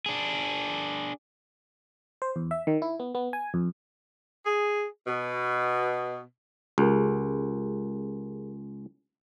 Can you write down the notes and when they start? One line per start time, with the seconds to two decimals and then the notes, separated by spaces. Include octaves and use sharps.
0.06 D4 G#4
2.22 C5
2.36 E2
2.51 E5
2.67 D#3
2.82 E4
3.00 B3
3.15 B3
3.33 G#5
3.54 F2
4.45 G#4
5.07 B2
6.78 C#2 G4 G#4 A#4